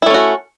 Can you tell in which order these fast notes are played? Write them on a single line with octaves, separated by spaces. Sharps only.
E4 A3 C#4 F#4